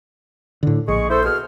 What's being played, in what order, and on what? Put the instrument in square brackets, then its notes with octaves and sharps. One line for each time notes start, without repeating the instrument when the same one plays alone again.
[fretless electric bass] A2 D3
[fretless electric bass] A#1 [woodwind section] G#3 G#4 C#6
[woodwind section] E4 A4 C5
B2 G#4 F6